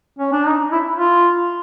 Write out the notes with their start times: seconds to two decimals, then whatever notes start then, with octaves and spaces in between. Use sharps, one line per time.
0.19 C#4
0.33 D4
0.46 D#4
0.72 E4
0.97 F4